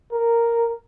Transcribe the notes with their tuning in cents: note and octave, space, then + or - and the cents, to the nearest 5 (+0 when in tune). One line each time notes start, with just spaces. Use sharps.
A#4 -5